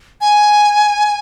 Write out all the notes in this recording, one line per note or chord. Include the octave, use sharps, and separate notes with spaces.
G#5